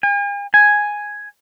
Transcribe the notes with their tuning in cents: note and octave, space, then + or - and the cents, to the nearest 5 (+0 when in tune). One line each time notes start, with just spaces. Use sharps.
G#5 -45
G#5 +0